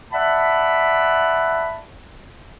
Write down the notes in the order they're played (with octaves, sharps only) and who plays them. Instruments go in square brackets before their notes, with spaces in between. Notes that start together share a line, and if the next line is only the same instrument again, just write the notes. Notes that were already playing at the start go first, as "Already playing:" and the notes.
[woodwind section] D5 E5 F#5 A5 B5